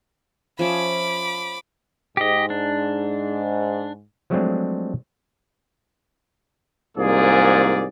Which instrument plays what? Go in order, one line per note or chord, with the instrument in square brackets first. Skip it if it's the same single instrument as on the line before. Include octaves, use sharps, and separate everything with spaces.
[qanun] F3 C#4 E5 [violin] B5 D6
[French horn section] G#2 [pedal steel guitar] G4 D#5
[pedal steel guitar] D4
[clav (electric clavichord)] F3 F#3 G#3 A3 C4 D4
[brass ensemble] C2 G#2 F3 A#3 G#4 D5